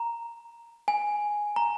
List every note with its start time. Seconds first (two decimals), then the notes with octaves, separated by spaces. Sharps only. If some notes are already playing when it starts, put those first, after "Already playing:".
Already playing: A#5
0.88 G#5
1.56 A#5